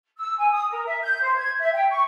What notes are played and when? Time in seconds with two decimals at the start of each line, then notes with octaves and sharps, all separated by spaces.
0.18 E6
0.38 G#5
0.52 D#6
0.71 A#4
0.85 E5
1.02 G6
1.22 C5
1.36 G#6
1.59 E5
1.73 G5
1.90 C#6